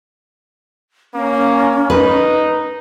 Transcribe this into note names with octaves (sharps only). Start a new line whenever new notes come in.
A#3 C#4
D#4 B4